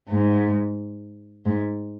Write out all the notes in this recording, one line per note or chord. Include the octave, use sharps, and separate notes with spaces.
G#2
G#2